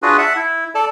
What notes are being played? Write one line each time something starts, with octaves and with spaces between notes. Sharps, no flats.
D4 F4 F#4 G#4 B4
E5 F#5 A5
E4
A4 D5 A5